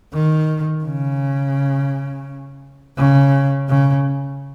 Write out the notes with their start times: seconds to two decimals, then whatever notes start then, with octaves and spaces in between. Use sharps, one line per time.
0.13 D#3
0.84 C#3
2.97 C#3
3.69 C#3